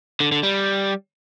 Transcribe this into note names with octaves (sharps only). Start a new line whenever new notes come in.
D3
D3
G3